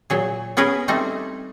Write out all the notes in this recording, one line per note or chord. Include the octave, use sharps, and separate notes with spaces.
A#2 F#3 G#4
B3 C#4 G#4 A#4 B4
G3 A3 C4 D#4 A4